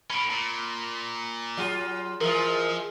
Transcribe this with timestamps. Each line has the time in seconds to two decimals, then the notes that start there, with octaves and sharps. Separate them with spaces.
0.10 A2 C#4 B5 D7
0.30 A#2
1.57 F#3 F4 G#4
2.21 E3 F3 G#3 F4 A#4